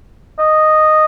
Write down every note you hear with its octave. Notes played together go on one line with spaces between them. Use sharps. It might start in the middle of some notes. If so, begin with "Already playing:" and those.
D#5